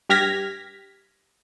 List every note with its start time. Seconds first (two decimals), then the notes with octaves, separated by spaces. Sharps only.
0.09 G2 G4 F6 G#6 A#6 B6